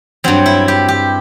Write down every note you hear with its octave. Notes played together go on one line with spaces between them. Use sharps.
G2 F#3 C4
E4
G4
G4